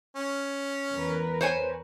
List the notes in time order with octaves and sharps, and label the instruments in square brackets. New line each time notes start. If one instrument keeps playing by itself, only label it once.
[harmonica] C#4
[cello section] E2 A#4 B4
[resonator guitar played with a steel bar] C5 C#5 G#5